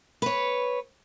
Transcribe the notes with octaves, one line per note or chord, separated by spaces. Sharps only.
B4 C#5